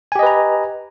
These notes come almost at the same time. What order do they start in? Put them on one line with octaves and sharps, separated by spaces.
G#5 G4 D#5 B4 A#5